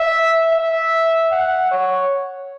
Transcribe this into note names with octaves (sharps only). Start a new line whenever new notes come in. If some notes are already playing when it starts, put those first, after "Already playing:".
Already playing: E5
E5
F#5
C#5